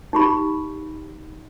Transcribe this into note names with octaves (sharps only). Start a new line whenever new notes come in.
D#4 G4 B5